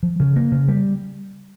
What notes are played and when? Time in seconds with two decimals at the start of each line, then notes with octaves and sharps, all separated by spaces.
0.03 F3
0.20 C#3
0.36 A#3
0.52 C#3
0.68 G3